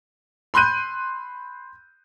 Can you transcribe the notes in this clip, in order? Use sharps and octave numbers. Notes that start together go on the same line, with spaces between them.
B5 C6 F#6 G6 D#7